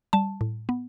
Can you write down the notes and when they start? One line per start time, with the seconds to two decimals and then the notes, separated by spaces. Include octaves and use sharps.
0.13 G3 A5
0.41 A2
0.69 B3